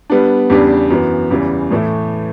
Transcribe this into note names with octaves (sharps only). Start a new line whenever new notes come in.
G3 B3 D4
E2 C#3 G3 D4 G4
F#2 E3 B3
E2 C#3 E3 G3
A2 E3 A3 E4